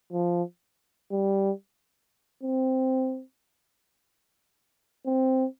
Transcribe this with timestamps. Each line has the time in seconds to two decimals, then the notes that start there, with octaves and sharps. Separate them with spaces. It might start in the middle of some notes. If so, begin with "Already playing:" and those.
0.13 F3
1.11 G3
2.43 C4
5.06 C4